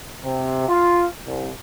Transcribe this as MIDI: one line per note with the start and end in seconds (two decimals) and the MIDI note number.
0.23 0.67 48
0.68 1.05 65
1.26 1.50 36